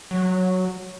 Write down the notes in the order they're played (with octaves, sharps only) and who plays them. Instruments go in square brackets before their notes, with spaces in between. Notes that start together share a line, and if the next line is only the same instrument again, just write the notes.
[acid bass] F#3